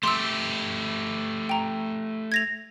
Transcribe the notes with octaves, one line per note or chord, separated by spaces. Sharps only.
A3 G4 C6 E6
G5 A#5
G#6 A#6 F7